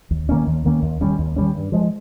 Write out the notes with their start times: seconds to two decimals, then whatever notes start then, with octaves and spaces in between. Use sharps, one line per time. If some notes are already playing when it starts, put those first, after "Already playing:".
0.11 D#2
0.29 D#3 A#3 C#4
0.47 D#2
0.65 D#3 A#3 C#4
0.82 D#2
1.01 D#3 G3 C#4
1.18 D#2
1.36 D#3 G3 C#4
1.55 G2
1.72 F3 G#3